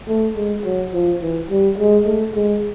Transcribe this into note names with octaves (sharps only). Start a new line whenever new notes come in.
A3
G#3
F#3
F3
E3
G3
G#3
A3
G#3